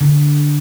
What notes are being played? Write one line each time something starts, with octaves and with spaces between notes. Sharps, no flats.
D3